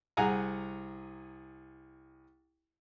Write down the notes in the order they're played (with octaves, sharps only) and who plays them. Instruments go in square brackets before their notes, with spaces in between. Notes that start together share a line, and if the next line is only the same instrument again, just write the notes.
[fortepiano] C2 G#4 F#5 G#5 A#5